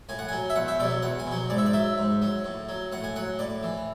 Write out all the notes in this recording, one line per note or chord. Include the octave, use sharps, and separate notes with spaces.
A2 G#5
F#5
F#3 G#5
E5
E2 F#5
E5
B2 F#3 D5
E2 F#5
G#5
B2 F#3
G#2 D5
E5
D5
F#3 E5
G#2
F#3
A2
F#3
A2 F#5
G#5
F#3 F#5
A2 D5
E3